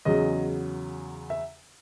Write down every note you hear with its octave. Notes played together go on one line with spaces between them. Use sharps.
E2 C#3 F#3 D#5
E5